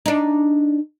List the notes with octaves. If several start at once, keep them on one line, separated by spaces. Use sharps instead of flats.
D4 D#4